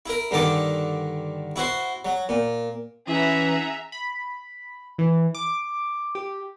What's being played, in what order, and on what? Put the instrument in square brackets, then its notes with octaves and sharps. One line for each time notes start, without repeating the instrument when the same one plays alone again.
[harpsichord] E4 A#4
G2 D3 D#3 A4 D6
E4 F#4 C5
F#3
A#2
[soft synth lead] E3 [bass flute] C#4 [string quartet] G#4 F#5 [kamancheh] E5 A#5
[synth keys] B5
E3
D6
G4